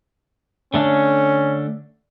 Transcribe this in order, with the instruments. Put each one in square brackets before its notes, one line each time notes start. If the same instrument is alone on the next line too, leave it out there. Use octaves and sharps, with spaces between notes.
[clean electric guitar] D3 A3 D4 [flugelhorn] C#4